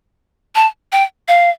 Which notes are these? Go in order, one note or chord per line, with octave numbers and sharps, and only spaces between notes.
A5
G5
F5